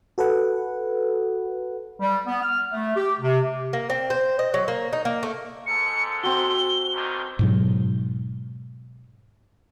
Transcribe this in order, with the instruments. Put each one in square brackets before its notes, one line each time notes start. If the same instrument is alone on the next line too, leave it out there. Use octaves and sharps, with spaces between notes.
[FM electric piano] F#4 A4 B4 F#5
[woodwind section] G3
B3
F6
A3
G4
C3
[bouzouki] A#3
C4
C5
D#5
F#3
A#3
D#4
A#3
A3
[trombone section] G#2 A4 [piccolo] C#7
[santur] C4 F#4 [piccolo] G7
[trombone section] G2 D3 D#3
[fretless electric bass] G#2 B2 F#3